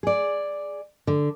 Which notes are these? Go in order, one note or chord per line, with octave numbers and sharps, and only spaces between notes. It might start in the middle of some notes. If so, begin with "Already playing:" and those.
G#4 D5
D3